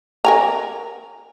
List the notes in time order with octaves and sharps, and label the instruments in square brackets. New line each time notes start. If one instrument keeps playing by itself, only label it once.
[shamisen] A#4 G#5 A#5